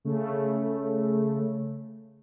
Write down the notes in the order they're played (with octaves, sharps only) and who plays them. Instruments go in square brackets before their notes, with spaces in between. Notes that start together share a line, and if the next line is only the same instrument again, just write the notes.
[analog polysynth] C#3 A3